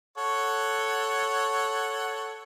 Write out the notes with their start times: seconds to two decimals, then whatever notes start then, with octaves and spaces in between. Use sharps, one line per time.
0.18 A4 C#5 F#5